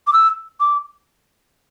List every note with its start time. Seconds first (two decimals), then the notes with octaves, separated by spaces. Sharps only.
0.07 D6
0.13 E6
0.60 D6